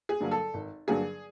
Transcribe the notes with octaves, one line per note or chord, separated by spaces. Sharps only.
G#4
G2 D3 F#3 A#3
A4
G#1
G2 D3 F#3 A#3 G#4